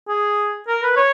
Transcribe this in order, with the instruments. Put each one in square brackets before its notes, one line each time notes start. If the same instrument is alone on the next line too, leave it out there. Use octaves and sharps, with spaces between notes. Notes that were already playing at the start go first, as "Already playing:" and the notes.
[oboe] G#4
A#4
B4
C#5